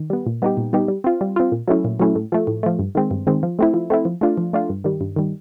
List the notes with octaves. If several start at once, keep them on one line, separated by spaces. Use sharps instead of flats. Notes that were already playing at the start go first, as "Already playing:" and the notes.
Already playing: D#3
G3 B3
A#2
G3 B3 D#4 G4
A#2
G3 B3 D#4 G4
G3
C4 F4
G3
C4 F4
A#2
F#3 A3 C#4 E4
A#2
F#3 A3 C#4 E4
A2
F3 A3
A2
F3 A3
G2
D#3 G#3 C4
G2
D#3 G#3 C4
F3
A3 C4 E4
F3
A3 C4 E4
F3
A3 D4 F4
F3
A3 D4 F4
G2
D#3 G3
G2
D#3 G3